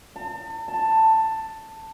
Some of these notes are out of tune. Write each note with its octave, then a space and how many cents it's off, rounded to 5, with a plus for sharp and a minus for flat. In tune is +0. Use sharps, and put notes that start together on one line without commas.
A5 +40
A5 +10